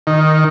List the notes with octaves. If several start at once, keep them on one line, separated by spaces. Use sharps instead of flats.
D#3